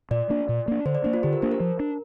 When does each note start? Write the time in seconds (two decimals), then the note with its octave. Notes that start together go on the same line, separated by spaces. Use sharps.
0.11 A#2 D5
0.30 A#3 D4
0.49 A#2
0.68 A#3 D4
0.85 D3 C5
0.95 D5
1.04 A#3 D4 C5
1.13 F4
1.23 D3 G4
1.33 A#4
1.42 A#3 D4 C5
1.51 A#4
1.60 F3
1.80 D4